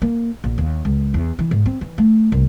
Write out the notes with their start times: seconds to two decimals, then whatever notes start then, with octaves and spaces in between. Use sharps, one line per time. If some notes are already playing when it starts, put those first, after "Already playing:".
0.02 A#3
0.44 A#1
0.58 D#2
0.85 C#2
1.14 E2
1.39 E3
1.51 G#2
1.66 C4
1.81 E3
1.98 A3
2.32 C2